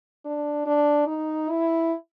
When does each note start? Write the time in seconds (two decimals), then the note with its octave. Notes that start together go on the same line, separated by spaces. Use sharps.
0.25 D4
0.66 D4
1.07 D#4
1.50 E4